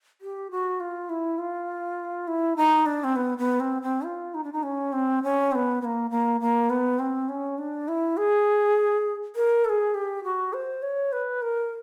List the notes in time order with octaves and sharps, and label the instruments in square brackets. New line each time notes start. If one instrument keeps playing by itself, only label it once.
[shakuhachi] G4
F#4
F4
E4
F4
E4
D#4
D4
C4
B3
B3
C4
C4
F4
D#4
D4
D#4
C#4
C4
C#4
C4
B3
B3
A#3
A#3
A#3
B3
C4
C#4
D4
E4
G#4
A#4
A4
G#4
G4
F#4
C5
C#5
B4
A#4